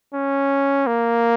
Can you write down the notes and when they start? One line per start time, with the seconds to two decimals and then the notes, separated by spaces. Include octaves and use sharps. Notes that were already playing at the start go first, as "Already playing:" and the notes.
0.13 C#4
0.87 A#3